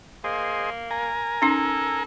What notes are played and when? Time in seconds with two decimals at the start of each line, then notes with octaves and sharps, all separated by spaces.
0.24 A#3 G#4 C5 D#5
0.91 A#4 G#5 A#5
1.42 C#4 D#4 A4